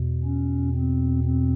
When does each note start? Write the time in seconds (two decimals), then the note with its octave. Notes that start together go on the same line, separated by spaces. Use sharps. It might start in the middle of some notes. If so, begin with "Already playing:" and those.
Already playing: E2 B2
0.24 C#4
0.75 C4
1.25 C4